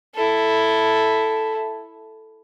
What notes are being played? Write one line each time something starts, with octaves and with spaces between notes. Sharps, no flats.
E4 A4